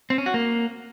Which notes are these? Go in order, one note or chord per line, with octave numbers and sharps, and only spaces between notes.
C4
C#4
F#4
A#3